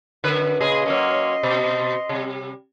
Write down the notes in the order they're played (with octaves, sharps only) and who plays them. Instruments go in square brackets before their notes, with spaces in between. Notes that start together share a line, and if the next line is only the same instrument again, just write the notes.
[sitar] F#2 D3 B4
[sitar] A#2 C#3 G#4 [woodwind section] D#5 C6
[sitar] F#3 A#3 C#4
B2
C3 G3